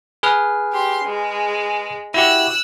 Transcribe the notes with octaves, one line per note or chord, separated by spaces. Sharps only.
G#4 B4 F6
G4 C6
G#3
E4 F#4 G4 E6 F#6